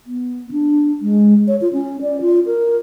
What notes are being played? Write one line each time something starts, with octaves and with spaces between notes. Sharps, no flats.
B3
D4
G#3
C#5
F4
C#4
D5
F4
A#4